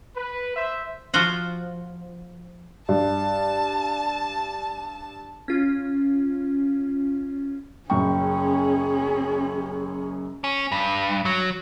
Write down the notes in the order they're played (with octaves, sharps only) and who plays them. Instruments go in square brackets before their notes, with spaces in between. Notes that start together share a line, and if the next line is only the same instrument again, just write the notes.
[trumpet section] B4
C5 E5
[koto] F3 F4 F#4 C5 F#5
[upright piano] G2 [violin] A5
[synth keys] C#4 F4
[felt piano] F#1 F#2 C#6 [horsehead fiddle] C#4 G#4 [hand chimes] G5
[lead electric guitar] C#4
G2
F#3